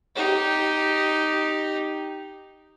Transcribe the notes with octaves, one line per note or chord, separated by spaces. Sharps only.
D#4 G4